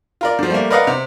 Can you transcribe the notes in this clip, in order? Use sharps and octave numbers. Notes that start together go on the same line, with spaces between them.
F4 A#4 D5
D3 F3
G3 A3 A#3
A#4 B4 D5 D#5 F5 F#5
C3